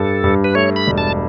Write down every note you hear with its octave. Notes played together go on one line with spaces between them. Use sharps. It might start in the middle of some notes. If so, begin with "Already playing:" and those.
Already playing: G2 A4
G2
B4
A3 C#5
B5
E1
A5